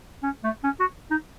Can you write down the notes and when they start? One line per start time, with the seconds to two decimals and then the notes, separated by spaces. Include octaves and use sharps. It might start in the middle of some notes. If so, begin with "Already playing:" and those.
0.23 C#4
0.44 A3
0.64 C#4
0.80 F#4
1.11 D#4